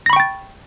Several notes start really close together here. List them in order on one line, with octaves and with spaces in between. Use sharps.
A#6 B5 C#6 G5 A6